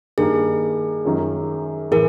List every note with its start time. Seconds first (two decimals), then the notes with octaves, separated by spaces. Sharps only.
0.18 G2 D#3 G3 A#3 D#4 G#4
1.05 F#2 D#3 G#3 C#4 F4
1.91 A2 E3 G#4 A#4